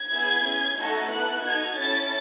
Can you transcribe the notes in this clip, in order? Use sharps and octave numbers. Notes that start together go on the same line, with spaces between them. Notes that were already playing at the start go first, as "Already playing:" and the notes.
Already playing: G#6
B3 E4 G#4
C#4 G#4
A3 D#4 F#4 A4
B3 E4 A4 F#6
D#4 F#4 A4 G#6
C#4 E4 A4 A6